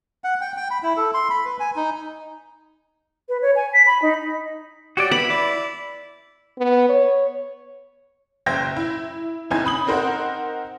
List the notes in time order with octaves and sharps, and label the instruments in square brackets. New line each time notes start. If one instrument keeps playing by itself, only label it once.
[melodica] F#5
G5
G5
B5
E4
A4
C6
B5
B4
G#5
D#4
[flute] B4
C#5
G#5
B6
B5
D#4
[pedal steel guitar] F#4 C#5 D5 [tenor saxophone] G4
[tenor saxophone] B3 [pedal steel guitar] E4 [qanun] B5
[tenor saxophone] D5
[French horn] B3
C#5
[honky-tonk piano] F#1 C5 E5 G5 G#6 A#6
E4
F#1 C4 D#4 E4 G#5 G#6
B5 D#6 F#7
C4 D#4 A#4 C5 D#5 F#5